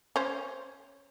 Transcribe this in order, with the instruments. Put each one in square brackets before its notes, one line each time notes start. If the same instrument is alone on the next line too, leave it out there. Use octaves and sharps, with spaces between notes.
[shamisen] C#4 C5